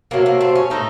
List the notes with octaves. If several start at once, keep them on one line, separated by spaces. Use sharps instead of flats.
C3 F#3 A3 A#3
A#3
C4
C#4
A2 A3 D#4